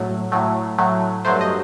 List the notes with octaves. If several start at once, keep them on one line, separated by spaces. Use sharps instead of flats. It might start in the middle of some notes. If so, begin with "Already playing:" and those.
Already playing: A2 F#3 A3
A2 F#3 A3
A2 F#3 A3
G2 F#3 A3 C5
D#5